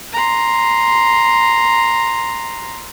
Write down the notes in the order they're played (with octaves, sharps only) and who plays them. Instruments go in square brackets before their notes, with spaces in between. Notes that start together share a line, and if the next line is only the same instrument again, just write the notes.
[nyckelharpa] A#5 C6